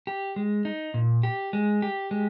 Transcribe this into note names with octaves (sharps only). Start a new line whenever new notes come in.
G4
G#3
D#4
A#2
G4
G#3
G4
G#3